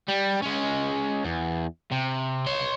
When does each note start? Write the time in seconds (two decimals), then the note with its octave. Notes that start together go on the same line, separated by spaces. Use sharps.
0.09 G3
0.43 G#3 C#4
1.24 E2
1.92 C3
2.46 C#5 C6